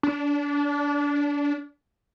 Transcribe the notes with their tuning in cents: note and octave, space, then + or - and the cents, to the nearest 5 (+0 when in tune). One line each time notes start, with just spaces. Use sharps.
D4 -25